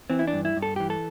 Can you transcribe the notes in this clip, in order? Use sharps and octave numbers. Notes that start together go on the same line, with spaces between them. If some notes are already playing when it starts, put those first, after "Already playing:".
E3 C4
E4
D4
G2
E4
G2
A4
E3 G4
A4